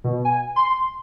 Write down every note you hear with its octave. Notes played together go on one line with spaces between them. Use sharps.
B2
G#5
C6